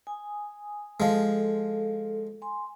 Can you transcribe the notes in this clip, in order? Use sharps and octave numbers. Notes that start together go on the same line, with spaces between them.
G#5 D#6
F3 G#3 A4
G#5 C6